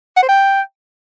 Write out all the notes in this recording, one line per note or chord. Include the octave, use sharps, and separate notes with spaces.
F#5
C5
G5